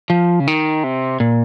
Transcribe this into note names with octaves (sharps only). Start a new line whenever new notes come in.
F3
C#3
D#3
C3
A#2